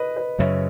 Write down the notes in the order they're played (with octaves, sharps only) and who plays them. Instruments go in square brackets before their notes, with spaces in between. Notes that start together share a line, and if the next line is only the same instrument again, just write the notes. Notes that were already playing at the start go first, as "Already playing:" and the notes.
Already playing: [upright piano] B4 D#5
B4 D#5
[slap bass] F#2 C#3 F#3 [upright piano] C#5 E5